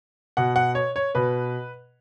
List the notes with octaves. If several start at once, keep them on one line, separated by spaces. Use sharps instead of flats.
B2 F#5
F#5
C#5
C#5
B2 B4